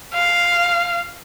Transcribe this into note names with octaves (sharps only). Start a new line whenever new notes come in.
F5